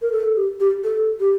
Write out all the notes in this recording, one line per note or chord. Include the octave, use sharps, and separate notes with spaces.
A#4
A4
G4
G4
A4
G4